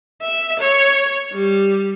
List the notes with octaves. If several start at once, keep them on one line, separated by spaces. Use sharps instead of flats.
E5
C#5
G3